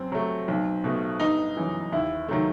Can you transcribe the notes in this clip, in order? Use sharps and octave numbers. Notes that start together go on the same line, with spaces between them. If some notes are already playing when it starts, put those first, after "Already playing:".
Already playing: F#2 C4
F#3 A3
B1
B2 A3
G1 D#4
F#2 E3
D#2 E4
D#3 F#3 A3